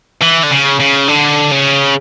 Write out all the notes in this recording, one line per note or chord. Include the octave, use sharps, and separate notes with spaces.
E3
D3
C#3
C#3
D3
C#3